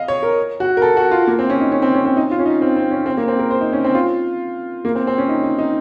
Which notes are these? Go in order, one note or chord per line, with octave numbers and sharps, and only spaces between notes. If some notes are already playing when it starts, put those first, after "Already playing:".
Already playing: D#5 F5
C#5
A#4
F#4
A#4
A4
F#4
F4
A#3
C4
C#4
D#4
C#4
C4
C#4
C4
D#4
F4
C#4
D#4
C4
C4
C#4
C4
A#3
C4
A#4
C5
D#4
C#4
C4
F4
A#3
C4
C4
C#4
D#4
D#4
D#4